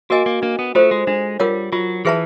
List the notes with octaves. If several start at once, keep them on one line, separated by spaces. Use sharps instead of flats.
A#3 F#4 A#4 D#5 G#5
A#3
A#3 D4
B3
A3 F4 A4 C5
G#3
G#3 D4
G3 F4 A#4 C#5 F#5
F#3 F4
E3 G#4 B4 E5 A5